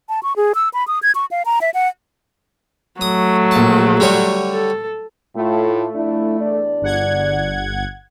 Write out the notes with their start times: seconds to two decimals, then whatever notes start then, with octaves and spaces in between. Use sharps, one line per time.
0.09 A5
0.23 C#6
0.36 G#4
0.55 E6
0.74 B5
0.88 D#6
1.03 G#6
1.15 C#6
1.31 F5
1.46 A#5
1.61 E5
1.74 F#5
3.01 F#3 A3 D#6
3.51 A#1 A5
4.00 D3 G3 C#5
4.53 A4
5.36 A2 A3 F4
5.94 F2 D4 E4
6.40 E2 D4 D5
6.82 G1 F#5 G#6